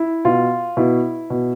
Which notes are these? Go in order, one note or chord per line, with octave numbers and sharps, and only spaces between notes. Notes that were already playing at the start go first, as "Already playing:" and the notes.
Already playing: E4
B2 F4
B2 E4
B2